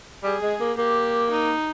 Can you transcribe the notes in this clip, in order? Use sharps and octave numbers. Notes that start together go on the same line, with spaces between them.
G3 G#4
G#3
A#3
A#3 G4
D#4